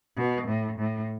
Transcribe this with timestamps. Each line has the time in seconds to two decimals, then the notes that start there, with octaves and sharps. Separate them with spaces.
0.17 B2
0.47 A2
0.79 A2